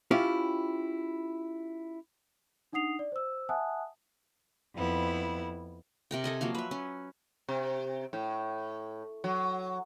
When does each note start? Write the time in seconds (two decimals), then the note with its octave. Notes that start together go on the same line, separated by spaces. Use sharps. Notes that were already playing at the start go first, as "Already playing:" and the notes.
0.11 C#4 E4 F4 G4
2.72 D4 D#4 F#5 D#6 C7 F7
2.99 D5
3.12 C5 E6
3.49 E5 F#5 G#5 A5 D#6 F#6
4.76 F2 B3 E4
6.11 C3 A#4 G5
6.24 A4 D#5 G#5
6.41 F3 F#3 A#3 F5
6.55 B4 E5
6.71 C#4
7.48 C3
8.13 A2
9.24 F#3